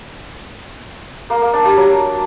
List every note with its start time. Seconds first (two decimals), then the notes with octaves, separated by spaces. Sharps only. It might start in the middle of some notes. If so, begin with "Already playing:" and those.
1.30 A#3
1.42 A#3
1.53 D4
1.65 G3
1.77 F#3